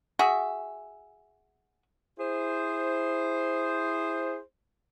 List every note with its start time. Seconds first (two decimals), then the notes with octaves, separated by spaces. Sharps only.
0.19 F#4 G#4 E5
2.19 E4 G#4 C5